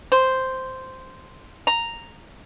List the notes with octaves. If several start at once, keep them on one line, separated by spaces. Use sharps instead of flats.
C5
A#5